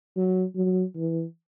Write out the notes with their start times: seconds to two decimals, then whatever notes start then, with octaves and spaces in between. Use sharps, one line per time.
0.16 F#3
0.55 F#3
0.96 E3